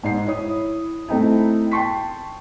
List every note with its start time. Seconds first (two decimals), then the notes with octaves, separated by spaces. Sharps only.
0.03 G#2 D#5 C7
0.27 E4 C#5 D#6
1.08 A3 C4 D#4 E4
1.71 G5 A5 C6 C#6 B6